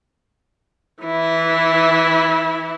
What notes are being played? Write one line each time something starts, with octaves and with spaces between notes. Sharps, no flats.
E3 E4